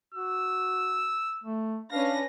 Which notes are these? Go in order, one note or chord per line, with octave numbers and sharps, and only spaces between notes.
F#4 E6
A3
C#4 D4 B4 F5 A#6